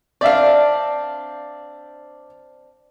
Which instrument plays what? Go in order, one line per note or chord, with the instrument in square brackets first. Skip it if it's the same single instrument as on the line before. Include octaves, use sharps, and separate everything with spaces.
[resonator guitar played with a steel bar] C4 D4 [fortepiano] D5 E5 F5